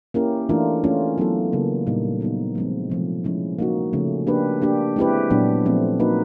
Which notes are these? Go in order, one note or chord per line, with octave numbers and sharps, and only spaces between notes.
A#3 C#4 E4 G4 A#4
E3 A3 D4 F4 A#4
A3 C#4 F4
F#3 B3 E4 A4
C#3 F#3 A#3
A#2 G3 A#3 D#4
F#3 B3 D#4
F3 G#3 C4
C3 F3 A3
F3 G#3 C#4 E4
A#3 D#4 F#4
C#3 F3 A3 C#4
A#3 D4 G4 B4
A#3 D4 G4
G#3 C4 E4 G4 B4
A#2 F#3 B3 D4
F3 A3 C4
A#3 D#4 F#4 B4